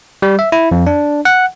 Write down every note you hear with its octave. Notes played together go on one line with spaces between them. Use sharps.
G3
E5
E4
F2
D4
F#5